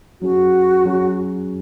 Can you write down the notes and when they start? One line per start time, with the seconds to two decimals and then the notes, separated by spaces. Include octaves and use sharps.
0.21 F#3 C#4 F#4 G#4
0.86 F#3 C#4 G#4